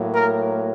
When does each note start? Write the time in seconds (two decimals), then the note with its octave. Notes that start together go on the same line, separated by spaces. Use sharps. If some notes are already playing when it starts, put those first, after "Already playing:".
Already playing: A2 F#3 A#3
0.14 A#4